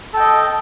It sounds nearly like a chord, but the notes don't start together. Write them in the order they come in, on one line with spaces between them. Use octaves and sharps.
A4 G5 D#5